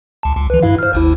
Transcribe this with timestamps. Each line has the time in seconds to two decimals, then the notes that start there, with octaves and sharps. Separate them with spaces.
0.23 C#2 A5
0.37 C#2
0.50 E3 B4
0.63 G2 E4 F5
0.79 C5 F6
0.93 G#1 D#2 E4